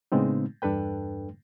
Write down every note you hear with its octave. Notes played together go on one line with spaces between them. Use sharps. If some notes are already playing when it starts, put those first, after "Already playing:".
A2 C#3 G#3 B3 C4 D#4
E2 G2 D4 A4 B4 G5